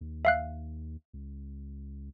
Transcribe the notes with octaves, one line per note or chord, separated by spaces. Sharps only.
D#2
E5 F5 F#6
C#2